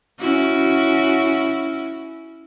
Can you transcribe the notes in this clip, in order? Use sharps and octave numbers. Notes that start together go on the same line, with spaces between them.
C#4 E4 F#4